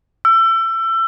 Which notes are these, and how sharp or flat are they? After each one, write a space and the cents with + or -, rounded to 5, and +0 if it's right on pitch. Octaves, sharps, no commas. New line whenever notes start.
E6 +30